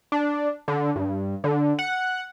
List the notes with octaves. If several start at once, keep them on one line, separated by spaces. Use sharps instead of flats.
D4
D3
G2
D3
F#5